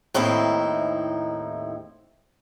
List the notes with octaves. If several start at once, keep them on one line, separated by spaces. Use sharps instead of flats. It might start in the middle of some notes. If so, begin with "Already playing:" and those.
D#2 A2 C4 D#4 E4